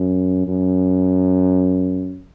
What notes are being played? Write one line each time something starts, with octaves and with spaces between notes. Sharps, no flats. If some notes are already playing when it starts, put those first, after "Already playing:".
Already playing: F#2
F#2